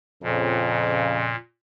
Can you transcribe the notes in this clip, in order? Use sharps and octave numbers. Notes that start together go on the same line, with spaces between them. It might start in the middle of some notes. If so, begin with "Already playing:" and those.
F2 A#2 C#3